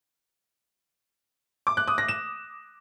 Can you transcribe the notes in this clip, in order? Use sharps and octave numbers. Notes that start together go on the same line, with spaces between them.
D6
F#6
D#6
A#6
E7